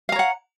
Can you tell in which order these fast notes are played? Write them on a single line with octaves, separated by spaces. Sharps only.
F5 A#5 C#5 F#5